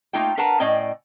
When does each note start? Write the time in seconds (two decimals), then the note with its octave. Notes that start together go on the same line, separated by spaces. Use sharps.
0.13 A3 A#3 D#4 F4 G5
0.37 D4 A#4 B4 F#5 A5 A#5
0.60 A2 C#4 D5 D#5 G5